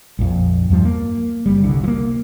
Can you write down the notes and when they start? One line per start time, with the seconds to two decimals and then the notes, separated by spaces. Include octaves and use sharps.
0.19 A#1 F2
0.70 E2 G2 F3
0.85 A#3
1.46 F#1 G3
1.64 C2 D3
1.84 F3 A#3